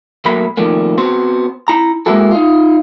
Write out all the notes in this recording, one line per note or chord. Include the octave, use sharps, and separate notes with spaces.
B1 F#3 A3 A#3 B5
C3 D#3 F3 G3 A3 A#3
B3 C4 F#4 C5
E4 A#5
G#3 A#3 C4 E4 F#4 A4
D#4 F4